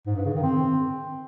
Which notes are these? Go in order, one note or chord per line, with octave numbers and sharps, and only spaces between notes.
G#2
G2
C#3
D#3
C4